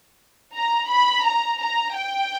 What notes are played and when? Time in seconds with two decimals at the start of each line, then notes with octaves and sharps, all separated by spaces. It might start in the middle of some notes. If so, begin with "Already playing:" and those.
0.55 A#5
0.90 B5
1.27 A#5
1.61 A#5
1.96 G5